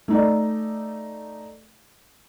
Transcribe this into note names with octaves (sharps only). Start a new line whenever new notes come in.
A3 D#4 D5